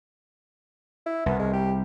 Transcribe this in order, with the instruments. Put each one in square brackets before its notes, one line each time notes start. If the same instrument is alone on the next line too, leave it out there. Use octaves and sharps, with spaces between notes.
[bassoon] E4
[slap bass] C2 [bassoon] B3
[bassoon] G#3
G4